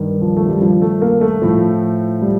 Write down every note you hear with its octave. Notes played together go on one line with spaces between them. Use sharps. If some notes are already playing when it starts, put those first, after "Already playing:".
Already playing: G2 D#3
F3
A3
G3
F3
A3
A#3
A3
A2 F3
G3